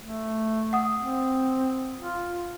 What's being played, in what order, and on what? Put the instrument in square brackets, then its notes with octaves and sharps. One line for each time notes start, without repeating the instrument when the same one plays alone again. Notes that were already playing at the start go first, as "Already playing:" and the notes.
[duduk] A3
[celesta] F#5 D#6
[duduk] C4
F4